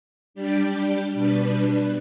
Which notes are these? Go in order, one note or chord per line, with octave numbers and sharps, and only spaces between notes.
G3 D4 G4 D5
B2 G3 D4 B4